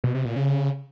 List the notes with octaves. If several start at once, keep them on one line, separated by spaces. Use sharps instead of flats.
B2
C3
A#2
C#3